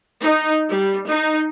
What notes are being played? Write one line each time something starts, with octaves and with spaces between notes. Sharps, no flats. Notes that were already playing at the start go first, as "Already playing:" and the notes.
D#4
G3
D#4